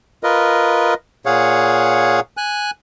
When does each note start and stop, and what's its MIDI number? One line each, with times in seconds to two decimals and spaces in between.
0.23 0.94 65
0.23 0.94 70
0.23 0.94 71
0.23 0.94 75
1.26 2.20 46
1.26 2.20 68
1.26 2.20 73
1.26 2.20 77
1.26 2.20 78
2.37 2.71 80
2.37 2.71 90